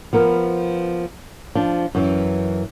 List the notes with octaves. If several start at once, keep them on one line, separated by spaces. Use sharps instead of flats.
F3 B3 A#4
F3 D4
F#2 E3